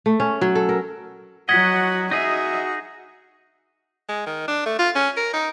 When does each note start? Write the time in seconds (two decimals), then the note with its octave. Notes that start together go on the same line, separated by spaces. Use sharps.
0.06 A3
0.20 C#4
0.41 F#3
0.55 A4
0.69 A#4
1.49 F#3 F#4 D#5 F#5 G#6 B6
2.11 D#4 F#4 G#4 D#5 E5
4.09 G#3
4.26 D#3
4.48 D4
4.66 A3
4.79 F4
4.95 C#4
5.17 A#4
5.33 D#4